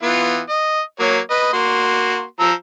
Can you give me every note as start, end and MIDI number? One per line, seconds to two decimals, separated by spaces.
0.03 0.40 52
0.03 0.40 59
0.03 0.40 65
0.50 0.80 75
1.00 1.19 54
1.00 1.19 58
1.00 1.19 73
1.30 1.53 71
1.30 1.53 75
1.53 2.23 58
1.53 2.23 66
1.53 2.23 84
2.40 2.53 53
2.40 2.53 82
2.40 2.53 88